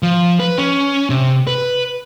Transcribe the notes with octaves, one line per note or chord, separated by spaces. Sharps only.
F3
B4
C#4
C3
B4